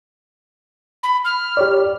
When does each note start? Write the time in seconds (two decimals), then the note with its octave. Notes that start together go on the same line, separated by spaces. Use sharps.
1.03 B5
1.25 F6
1.57 G4 C#5 D5